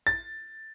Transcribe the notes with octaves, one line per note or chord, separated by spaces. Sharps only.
A6